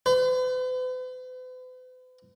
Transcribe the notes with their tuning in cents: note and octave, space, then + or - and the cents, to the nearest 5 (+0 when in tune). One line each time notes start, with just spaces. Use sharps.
B4 +45